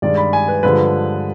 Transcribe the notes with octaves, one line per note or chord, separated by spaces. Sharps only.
G2 D#3 G#3 D5
B5
G#5
B4
G2 D3 F3 G#3 B4